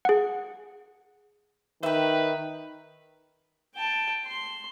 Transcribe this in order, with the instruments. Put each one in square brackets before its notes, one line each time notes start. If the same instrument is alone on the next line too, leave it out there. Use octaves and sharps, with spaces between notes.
[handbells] G#4 F#5
[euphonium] D#3 [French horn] B4 [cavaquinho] E5 G5
[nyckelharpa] G5 A5
C6